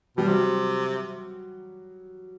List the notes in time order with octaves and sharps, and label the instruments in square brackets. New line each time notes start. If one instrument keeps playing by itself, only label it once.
[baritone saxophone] B2 [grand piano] G3
[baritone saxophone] C3 [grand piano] F#3